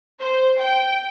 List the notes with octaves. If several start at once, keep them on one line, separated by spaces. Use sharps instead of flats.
C5
G5